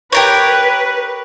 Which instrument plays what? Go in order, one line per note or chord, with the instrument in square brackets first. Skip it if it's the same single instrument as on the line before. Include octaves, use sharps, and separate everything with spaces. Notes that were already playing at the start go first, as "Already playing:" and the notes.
[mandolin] G4 A#4 C#5 [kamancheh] B4